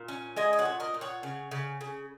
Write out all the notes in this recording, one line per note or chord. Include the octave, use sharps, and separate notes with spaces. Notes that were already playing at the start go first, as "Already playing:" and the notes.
Already playing: A#2
C#4
G#3 D#5 G#5
D#5
C#5 F#5
A#2
A#4 D#5
A#2
C#5 F#5
C#3
C#3
C#3